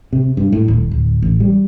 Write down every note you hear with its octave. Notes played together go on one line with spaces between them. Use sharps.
C3
G2
A2
D#1
D1
A1
G3